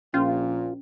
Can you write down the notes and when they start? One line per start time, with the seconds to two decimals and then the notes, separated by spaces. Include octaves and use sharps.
0.14 A#1 A#2 C#4 F4